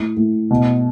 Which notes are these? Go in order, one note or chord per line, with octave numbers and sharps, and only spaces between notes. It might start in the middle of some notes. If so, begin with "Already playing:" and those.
Already playing: A2
A2
B2